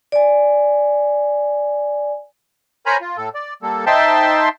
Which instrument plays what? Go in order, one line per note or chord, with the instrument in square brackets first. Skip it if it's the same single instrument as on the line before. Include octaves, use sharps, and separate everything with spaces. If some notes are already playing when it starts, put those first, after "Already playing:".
[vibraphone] D5 G#5
[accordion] A#4 C5 C#5 G#5 A#5 B5
F4
A2 A4
D5
G3 A#3 A4
D#4 C5 E5 G5 A5 C6